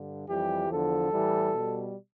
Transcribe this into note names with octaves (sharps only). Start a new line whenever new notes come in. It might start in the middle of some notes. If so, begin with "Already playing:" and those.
Already playing: G2 D3
F2 E3 G3 G4
E2 D3 F3 A4
A2 E3 G3
B2
G3